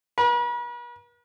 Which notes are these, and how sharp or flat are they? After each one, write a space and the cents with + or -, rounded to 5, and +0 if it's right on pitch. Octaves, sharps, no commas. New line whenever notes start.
B4 -45